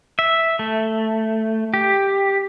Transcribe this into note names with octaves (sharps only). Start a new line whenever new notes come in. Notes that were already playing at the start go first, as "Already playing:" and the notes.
E5
A3
G4